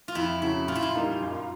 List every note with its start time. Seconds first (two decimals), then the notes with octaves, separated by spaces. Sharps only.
0.08 F4
0.15 F2 E4
0.41 C#3 F#3 E4
0.68 A#2 F4
0.75 E4
0.83 F4
0.95 G3 A#3 D#4
1.21 F#2